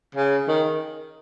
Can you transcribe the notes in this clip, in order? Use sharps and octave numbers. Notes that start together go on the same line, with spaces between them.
C#3
D#3